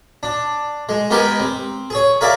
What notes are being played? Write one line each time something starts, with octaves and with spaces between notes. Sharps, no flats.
D4
G#3
G#3 B3 G4 A#4 G5 G#5
C4
G#4 C#5
G#4 A#4 D5 E5 F5